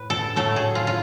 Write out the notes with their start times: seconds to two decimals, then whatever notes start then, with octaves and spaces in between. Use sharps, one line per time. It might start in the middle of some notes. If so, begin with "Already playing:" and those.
Already playing: A2 B4
0.10 A4
0.36 A2 F#3 A3 A4
0.56 G#4
0.75 F4
0.87 F4